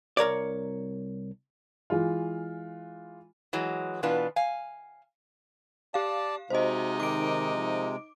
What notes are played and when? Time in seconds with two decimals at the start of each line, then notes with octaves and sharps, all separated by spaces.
0.17 C2 A#4 C#5 D5
1.90 E3 G#3 F4
3.53 E3 F#3 G#3
4.03 B2 E3 B3 D4 F4 B4
4.36 F5 G#5
5.94 G4 D5 F5 A5
6.50 C3 G#3 D#4 F#4 C5 D#5
7.00 D#3 D6 D7
7.54 D#3 F3